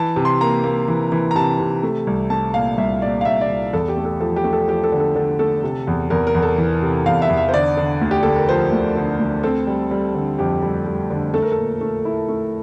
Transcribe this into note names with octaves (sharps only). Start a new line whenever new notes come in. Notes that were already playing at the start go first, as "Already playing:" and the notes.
Already playing: E3 A5
C3
C6
A#3 A#5
A#3
E3
E3
A#5
C3 A5
C3
A3
C2
A3 A5
A#2 F5
C2 E5
A#2 D5
F5
C2 E5
D5
C2
E2 A4
G4
A3
A4
F3 A4
G4
A3
A4
F3 G4
A4
D3
A4
D3 A4
A3 A4
C3
E2
E2 A#4
A#4
E2
A4
E3
C3
E2 F5
E5
E2
E5
C5
D3 D5
D3
D2
G4
D2 A4
A#4
F3 C5
D2
D3
D2
C4 A4
G3
G3
D3
F2 G4
G3
G3
D3
A3 A4
A#4
A4
A#2
A3
E4
A3